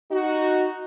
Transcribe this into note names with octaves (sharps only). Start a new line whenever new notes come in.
D#4 F#4